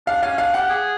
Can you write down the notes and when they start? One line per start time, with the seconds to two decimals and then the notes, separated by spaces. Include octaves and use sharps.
0.07 D4 F5
0.23 C#4 F5
0.38 D4 F5
0.54 G4 F#5
0.70 G#4